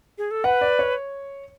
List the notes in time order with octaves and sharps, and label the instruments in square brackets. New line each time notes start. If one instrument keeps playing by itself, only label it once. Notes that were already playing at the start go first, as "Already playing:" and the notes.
[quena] G#4
A4
[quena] B4 [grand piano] F#5
[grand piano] D5
C#5